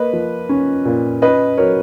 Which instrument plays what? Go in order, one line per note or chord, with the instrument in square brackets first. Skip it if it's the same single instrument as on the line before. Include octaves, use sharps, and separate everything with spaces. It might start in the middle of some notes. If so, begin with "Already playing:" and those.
Already playing: [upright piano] A#3 B4 D#5
F3
C#4
A#2
C#4 B4 D#5
F#3 A#4 C#5